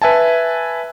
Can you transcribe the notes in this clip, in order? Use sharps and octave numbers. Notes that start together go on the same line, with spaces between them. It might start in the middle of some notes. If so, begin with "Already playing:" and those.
B4 E5 G#5 A5